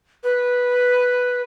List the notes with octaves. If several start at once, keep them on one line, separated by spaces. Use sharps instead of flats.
B4